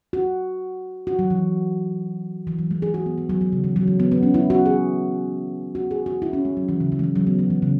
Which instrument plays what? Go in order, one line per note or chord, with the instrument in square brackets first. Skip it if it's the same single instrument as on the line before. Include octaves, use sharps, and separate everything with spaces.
[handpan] F#4
F#4
F#3
E3
E3
F#3
G#3
G#4
F#4
B3
G#3
F#3
F#3
C#3
E3
F#3
G#3
B3
B3
C#4
E4
F#4
G#4
F#4
G#4
F#4
E4
C#4
G#3
F#3
E3
C#3
E3
G#3
F#3
F#3
B3
F#3
E3
C#3